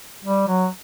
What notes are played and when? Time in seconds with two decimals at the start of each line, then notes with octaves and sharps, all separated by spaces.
0.24 G3
0.47 F#3